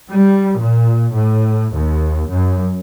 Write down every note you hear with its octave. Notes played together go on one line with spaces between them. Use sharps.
G3
A#2
A2
D#2
F#2